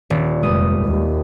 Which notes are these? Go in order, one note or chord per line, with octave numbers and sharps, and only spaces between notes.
D#1
F1 G3 G#3 B4 D#6
D#2